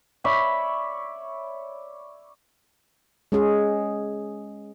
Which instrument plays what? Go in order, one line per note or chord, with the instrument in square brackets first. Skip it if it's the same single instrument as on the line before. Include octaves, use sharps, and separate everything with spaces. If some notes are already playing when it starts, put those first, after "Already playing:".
[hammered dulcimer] C#5 D5 E5 B5
[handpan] G#3 C#4 G#4